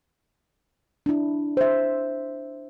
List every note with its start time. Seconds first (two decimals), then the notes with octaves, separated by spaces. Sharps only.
1.06 D4 E4
1.57 C5 E5